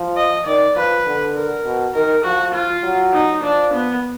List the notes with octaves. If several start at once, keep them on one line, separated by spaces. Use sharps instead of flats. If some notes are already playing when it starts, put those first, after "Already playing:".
Already playing: F3
D#5
D#3 D5
F3 B4
D3
A#4
B2
D#3 A#4
F3 F#4
F4
F#3
D#4
F3 D4
B3